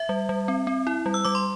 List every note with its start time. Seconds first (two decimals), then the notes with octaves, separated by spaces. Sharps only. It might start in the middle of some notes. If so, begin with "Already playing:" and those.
Already playing: E5
0.09 G3
0.29 G3
0.48 C4
0.67 C4
0.87 E4
1.06 G3
1.14 E6
1.25 G3 D6
1.35 C6